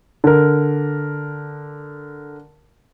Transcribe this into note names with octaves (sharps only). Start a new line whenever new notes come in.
D3 A#4